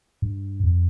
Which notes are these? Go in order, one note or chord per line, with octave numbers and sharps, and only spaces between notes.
G2
F2